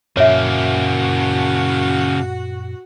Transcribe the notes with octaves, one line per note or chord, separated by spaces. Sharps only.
F#2 A#2 C#3 F3 A#3 F#4 C#5 E5